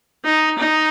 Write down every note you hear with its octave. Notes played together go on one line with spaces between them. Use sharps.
D#4
D#4